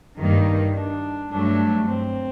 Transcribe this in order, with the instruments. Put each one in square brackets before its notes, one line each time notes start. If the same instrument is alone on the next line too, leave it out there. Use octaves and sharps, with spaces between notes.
[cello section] G2 D#3 G3 A#3 [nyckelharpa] D#4
[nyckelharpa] D4
[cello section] G2 F#3 A3 [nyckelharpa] D4
[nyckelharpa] C4